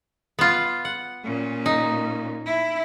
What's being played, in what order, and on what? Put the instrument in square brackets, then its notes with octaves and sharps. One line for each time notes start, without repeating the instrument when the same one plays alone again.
[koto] B3 F4
F#5
[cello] A#2 C#4
[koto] D#4
[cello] E4